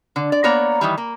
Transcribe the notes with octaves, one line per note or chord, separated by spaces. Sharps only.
D3
D5
A#3 B3 C#5 D5 A#5
D#3 E3 G3
A#3